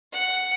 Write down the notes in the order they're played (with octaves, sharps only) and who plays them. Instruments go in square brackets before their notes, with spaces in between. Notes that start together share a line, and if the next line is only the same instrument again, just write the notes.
[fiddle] F#5